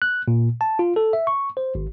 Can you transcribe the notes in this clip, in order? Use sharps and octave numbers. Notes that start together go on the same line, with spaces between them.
F#6
A#2
A5
F4
A4
E5
C#6
C5
G#1